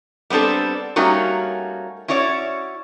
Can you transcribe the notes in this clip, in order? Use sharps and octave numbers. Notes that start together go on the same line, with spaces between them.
G3 B3 C4 D4 A4
G3 A3 A#3 C#4 D#4 F#4
C#4 E4 F#4 C#5 D5